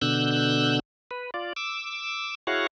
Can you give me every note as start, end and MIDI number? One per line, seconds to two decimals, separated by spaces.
0.02 0.79 47
0.02 0.79 50
0.02 0.79 88
0.02 0.79 90
0.02 0.79 91
1.11 1.30 71
1.34 1.53 65
1.34 1.53 74
1.56 2.35 86
1.56 2.35 88
2.47 2.67 64
2.47 2.67 66
2.47 2.67 68
2.47 2.67 73
2.47 2.67 77
2.47 2.67 78